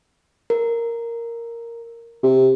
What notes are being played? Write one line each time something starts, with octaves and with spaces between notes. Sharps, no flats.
A#4
C3